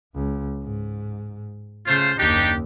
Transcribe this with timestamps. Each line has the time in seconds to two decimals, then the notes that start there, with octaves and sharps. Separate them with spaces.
0.14 C#2
0.62 G#2
1.86 C#3 A3 F4 C5
2.19 F#1 D#2 D4 D#4 G4